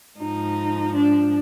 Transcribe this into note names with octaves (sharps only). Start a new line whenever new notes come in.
G#2 F3 D#4
D4